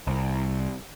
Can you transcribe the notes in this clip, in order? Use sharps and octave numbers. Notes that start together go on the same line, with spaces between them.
C2